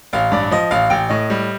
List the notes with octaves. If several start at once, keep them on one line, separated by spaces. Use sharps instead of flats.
A1 F5
G2 D5
F3 D#5
A1 F5
A1 G5
A2 D#5
G3